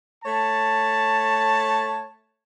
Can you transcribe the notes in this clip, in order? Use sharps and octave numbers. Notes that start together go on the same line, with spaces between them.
A3 C#5 A5